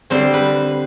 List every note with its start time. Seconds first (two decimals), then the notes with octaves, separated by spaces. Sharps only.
0.10 D3 G3 C4 C5
0.34 B4